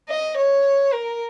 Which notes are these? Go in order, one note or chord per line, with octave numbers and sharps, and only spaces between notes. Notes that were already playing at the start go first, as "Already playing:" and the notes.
D#5
C#5
A#4